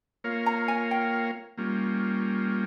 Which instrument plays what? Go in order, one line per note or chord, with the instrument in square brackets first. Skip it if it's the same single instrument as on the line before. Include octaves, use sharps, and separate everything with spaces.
[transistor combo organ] A#3 F4 A#4 C#5 F5
[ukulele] A#5
G#5
G5
[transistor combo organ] G3 A#3 C#4 F4